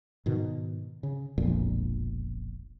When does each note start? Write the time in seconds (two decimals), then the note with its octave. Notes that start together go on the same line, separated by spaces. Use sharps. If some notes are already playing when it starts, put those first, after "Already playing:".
0.26 G#2 B2 D#3
1.03 C#3
1.38 E1 A#1 F2 A#2